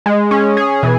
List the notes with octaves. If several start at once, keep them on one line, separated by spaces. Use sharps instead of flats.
G#3
C#4
G#4
B2 E3